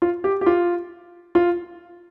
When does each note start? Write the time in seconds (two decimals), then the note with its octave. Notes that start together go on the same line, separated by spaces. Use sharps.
0.02 F4
0.24 G4
0.41 G4
0.46 F4
1.35 F4